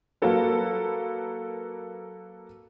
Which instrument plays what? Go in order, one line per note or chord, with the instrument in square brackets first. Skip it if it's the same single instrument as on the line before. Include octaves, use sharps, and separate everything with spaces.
[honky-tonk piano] F#3 A#3 F#4 A4 B4